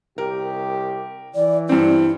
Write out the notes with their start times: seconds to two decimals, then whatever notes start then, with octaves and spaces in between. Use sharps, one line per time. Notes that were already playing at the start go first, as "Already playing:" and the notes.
0.18 C2 G4 A#4
1.35 E3 D5
1.69 G2 C4 E4